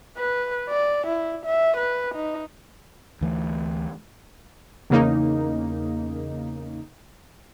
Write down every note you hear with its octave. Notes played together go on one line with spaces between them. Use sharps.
B4
D5
E4
E5
B4
D#4
D2 E3 A3
E2 C#3 A#3 D#4